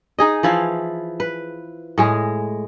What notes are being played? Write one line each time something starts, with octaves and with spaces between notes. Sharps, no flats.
D#4 G#4 D#5
E3 F3 E4 F5
B4
A2 G#3 G#4